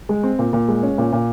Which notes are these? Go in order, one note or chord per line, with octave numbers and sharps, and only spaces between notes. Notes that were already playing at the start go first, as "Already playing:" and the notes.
G#3
C4
A#2
A#2
G#3
C#4
A#2
A#2